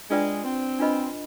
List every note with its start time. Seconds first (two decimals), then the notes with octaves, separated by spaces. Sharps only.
0.10 G#3 D4 F4 B4 D5 G5
0.44 C4
0.79 D4 F4 B4 D#5 B5